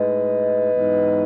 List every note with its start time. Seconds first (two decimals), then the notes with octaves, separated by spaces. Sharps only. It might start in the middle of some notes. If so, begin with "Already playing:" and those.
Already playing: A2 G#3 D#4 B4 D#5
0.74 G#2 E3 B3 D#4